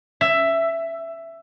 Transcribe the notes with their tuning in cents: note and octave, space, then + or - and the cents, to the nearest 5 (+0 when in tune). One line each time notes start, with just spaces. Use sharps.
E5 +10